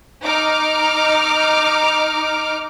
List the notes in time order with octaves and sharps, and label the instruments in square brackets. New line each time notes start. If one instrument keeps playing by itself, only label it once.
[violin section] D#4 D6 F6